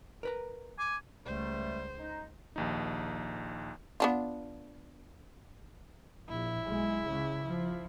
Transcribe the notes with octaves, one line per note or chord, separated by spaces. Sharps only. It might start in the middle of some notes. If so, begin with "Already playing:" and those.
A#4 B4 A#5
G#5 D6
C#2 G3 A3 C5
D#4
A#1 D#2 D#4
B3 D4 F4
A#1 E4
B1 G#3
C#2 C#3
F3